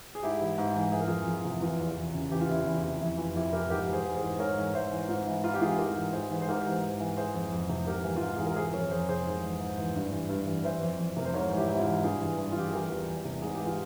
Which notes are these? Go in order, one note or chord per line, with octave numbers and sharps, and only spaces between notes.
G#4
G#2 E4 G4
E3
G#2
E3
E3 G#4
A#4
F2 F4 G#4
F2
C3
E3 F4
E2
E2
C#3
E3 G4
F4
E2 E4
E2 F4
C3
F2 E4
E3 F4
F2 E4 G4
E3 G4 A#4
G#2 G4 A#4
E3
G#4 C5
G#2
G#4 C5
E3
G#2 A#4 C#5
E3
G#2 C5 E5
E3
G#2 F4
E3 E4
G#2 F4
G4
E3 F4 G#4
G#2 G4 A#4
E3
G#2 G#4 C5
E3
C5
G#2 G4 A#4
E3
G#2
E3
E3 G#4 C5
F2
F2
C3
G#2 G4 A#4
E3
F4
G#2 G4
E3 G#4
A#4
E3 G#4 C5
F2 A#4 C#5
F2 G#4 C5
C3 G#4 C5
G#2
E3
G#2
E3
G2
E3
G2
E3
E3 C5 E5
F2
F2
C3 A#4
C5
G#2 A#4 C#5
E3
E4 G4
G#2
E4
F4
E3
G2 F4 G#4
E3
G2
F4
E3 G4
G#4
E3 G4 A#4
E2
E2
C3
G#2 G#4
G4
E3
F4